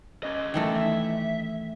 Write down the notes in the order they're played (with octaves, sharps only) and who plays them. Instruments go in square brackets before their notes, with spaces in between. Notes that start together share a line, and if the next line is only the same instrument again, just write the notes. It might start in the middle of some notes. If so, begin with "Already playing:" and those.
[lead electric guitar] C#4 D#5
[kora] D#3 E3 A3
[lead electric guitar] E5